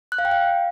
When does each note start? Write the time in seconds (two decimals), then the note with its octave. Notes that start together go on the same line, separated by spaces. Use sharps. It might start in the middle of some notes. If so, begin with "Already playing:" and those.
0.12 F#6
0.18 F5
0.25 G5
0.31 F5